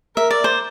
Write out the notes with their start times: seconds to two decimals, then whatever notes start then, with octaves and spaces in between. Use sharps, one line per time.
0.16 A#4 E5
0.31 D5
0.44 C5